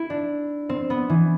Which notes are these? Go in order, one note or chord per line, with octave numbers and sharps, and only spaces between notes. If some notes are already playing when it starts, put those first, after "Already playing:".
Already playing: E4
D4
C4
B3
E3